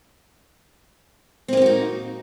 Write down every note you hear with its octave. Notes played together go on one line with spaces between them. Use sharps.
A#3 C4 D#4 F#4 G4